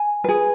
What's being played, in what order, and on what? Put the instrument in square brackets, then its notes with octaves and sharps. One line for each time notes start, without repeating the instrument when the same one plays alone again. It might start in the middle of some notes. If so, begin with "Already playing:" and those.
Already playing: [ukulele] G#5
G#4 B4